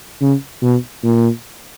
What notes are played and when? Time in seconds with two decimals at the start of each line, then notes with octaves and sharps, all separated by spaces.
0.21 C#3
0.63 B2
1.04 A#2